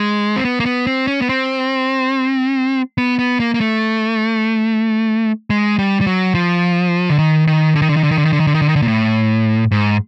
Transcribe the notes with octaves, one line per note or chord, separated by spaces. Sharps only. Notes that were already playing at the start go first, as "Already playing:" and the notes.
Already playing: G#3
C4
B3
A#3
B3
C4
C#4
B3
C4
B3
B3
A#3
A#3
A3
G#3
G3
G3
F#3
F3
D3
D#3
D#3
D3
D#3
D3
D#3
D3
D#3
D3
D#3
D3
D#3
D3
D#3
D3
D#3
D3
A#2
A2
G#2